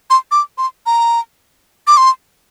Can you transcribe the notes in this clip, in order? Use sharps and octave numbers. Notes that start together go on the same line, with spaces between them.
C6
D6
C6
A#5
D6
C6